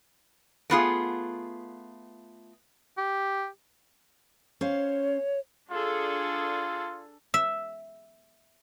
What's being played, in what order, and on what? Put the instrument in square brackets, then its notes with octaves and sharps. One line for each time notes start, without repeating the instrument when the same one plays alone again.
[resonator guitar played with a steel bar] A3 B3 F4 G#4
[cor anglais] G4
[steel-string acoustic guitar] C#4 C5 F5 [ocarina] C#5
[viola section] D4 G#4 A4 [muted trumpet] F4
[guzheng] E5